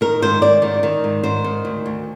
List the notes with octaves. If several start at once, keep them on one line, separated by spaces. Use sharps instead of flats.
D#3 A#4
G#2 C5
G#2 D5
D#3
D#3
G#2
G#2 C5
D#3
D2
D2